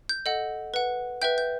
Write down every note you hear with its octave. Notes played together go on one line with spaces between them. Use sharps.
G6
A4 D#5 F#5
B4 F#5
B4 E5 G5 G6
G6